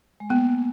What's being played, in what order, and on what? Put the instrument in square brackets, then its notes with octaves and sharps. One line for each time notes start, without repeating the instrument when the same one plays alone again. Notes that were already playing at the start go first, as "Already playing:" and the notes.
[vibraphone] G#3
[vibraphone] A#3 [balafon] B3